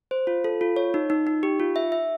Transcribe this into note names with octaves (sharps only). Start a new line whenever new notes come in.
C5
F4
A4
F4
C#5
D#4
D#4
D#4
G4
F4
E5
E5